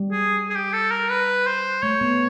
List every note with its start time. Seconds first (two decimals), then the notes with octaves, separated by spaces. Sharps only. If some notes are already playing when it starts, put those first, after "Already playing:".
Already playing: G3
0.11 G#4
0.50 G#4
0.55 G4
0.73 A4
0.91 A#4
1.10 B4
1.46 C5
1.82 A3 C#5
2.01 B3